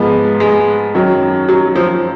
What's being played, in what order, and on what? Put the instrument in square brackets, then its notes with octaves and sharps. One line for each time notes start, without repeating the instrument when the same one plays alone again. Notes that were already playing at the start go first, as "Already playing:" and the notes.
Already playing: [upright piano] G#2 F3 G#3 B3
[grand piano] G#3
[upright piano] F#2 D#3 F#3
[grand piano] F#3
F3